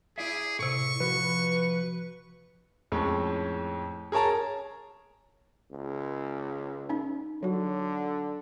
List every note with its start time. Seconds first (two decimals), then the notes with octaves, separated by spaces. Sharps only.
0.18 E4 G#4 D5 E5
0.59 A2 C3 C#6
1.00 F3 F#4 B4
2.92 F2 A2 G#3 C#4
4.12 G#4 A#4 C#5 A5 A#5
5.72 C#2
6.89 C#4 D#4
7.43 D3 F#3 F#4